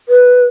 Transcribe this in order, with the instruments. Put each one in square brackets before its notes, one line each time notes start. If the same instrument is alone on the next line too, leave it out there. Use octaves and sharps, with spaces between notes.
[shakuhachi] B4